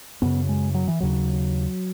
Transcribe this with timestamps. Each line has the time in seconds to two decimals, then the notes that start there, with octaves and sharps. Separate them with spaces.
0.22 F#2 C#3 B3
0.49 G#3
0.74 F#3
0.88 E3
1.00 D#2 C#3 F#3